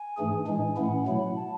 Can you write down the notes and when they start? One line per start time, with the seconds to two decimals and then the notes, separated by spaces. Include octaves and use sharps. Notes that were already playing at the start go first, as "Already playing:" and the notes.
Already playing: G#5
0.17 G#2 E3 A3 D4 G#4
0.47 A2 E3 G#3 D4 G#5
0.77 A2 E3 A3 C#4 E4 F#5
1.07 B2 F#3 A3 E4
1.36 A5